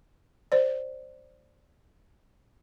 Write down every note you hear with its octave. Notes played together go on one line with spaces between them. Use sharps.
C5 D5